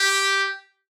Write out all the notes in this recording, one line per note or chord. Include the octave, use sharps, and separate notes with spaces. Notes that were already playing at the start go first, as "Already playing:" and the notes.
Already playing: G4